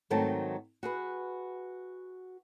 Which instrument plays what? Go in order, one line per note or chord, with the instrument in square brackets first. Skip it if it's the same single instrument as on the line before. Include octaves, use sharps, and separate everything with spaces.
[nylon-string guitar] G#2 D#3 F#3 A3 C4 A5
F#4 G#4 B4